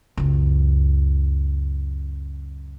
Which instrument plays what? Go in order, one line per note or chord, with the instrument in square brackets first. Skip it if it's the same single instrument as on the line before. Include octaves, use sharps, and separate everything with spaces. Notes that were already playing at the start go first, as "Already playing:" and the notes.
[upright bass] C#2 F#2